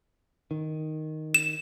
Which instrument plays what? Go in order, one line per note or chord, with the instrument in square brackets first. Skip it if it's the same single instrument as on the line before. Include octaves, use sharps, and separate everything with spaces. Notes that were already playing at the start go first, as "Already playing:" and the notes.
[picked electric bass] D#3
[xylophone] E7